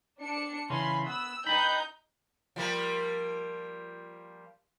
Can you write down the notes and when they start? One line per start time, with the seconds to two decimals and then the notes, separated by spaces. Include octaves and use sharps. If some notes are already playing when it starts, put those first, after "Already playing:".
0.20 D4 C#7
0.70 C#3 E3 C#4 B5 C6
1.06 B3 E6
1.47 D#4 B4 G5 B5 G6
2.56 F3 G3 A#3